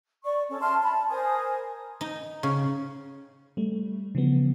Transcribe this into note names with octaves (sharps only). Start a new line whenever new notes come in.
D5 C#6
C#4 A4
E5 A5 C6 F6
A5 B5
A#4 C5 G#5 D#6
D#4
C#3
G3 A3
C#3 E3 F3 G3 B3